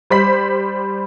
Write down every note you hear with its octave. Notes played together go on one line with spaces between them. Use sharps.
G3 C5 B5 B6